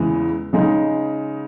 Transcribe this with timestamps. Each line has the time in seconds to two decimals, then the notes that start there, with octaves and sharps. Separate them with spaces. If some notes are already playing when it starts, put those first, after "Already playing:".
Already playing: E2 C#3 E3 G#3
0.53 C#3 G#3 D#4